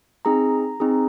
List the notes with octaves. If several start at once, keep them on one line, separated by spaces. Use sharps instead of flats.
C4 D#4 G#4 A#5
C4 D#4 G#4